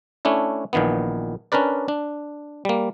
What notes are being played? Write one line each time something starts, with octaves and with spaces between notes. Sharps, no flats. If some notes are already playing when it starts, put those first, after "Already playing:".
A3 C#4 D4 E4
A#1 A#2 D#3 E3 B3
C#4 D4 A#4 B4 D5
D4
G3 A#3